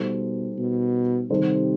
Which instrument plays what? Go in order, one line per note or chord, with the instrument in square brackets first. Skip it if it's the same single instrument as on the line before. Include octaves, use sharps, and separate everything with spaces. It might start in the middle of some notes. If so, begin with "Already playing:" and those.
Already playing: [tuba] B2 [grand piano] G3 D#4 A4 C5
[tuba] B2
[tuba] C3 [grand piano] D#3 G3 D#4 A4 C5